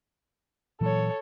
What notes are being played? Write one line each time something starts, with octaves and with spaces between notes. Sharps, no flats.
A#2 E3 F#3 A4 C#5